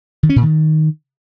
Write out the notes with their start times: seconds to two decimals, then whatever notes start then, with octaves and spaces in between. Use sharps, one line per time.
0.23 D#3
0.29 C#4
0.36 A#2
0.42 D#3